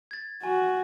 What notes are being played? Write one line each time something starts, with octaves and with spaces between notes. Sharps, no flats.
G#6 A6
F#4 G#5